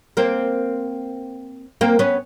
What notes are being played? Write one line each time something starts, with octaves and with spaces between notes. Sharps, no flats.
A#3 C4
A#3 C4
B3 C#4